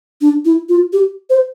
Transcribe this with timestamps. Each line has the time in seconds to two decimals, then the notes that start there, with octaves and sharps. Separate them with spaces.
0.21 D4
0.45 E4
0.69 F4
0.93 G4
1.30 C5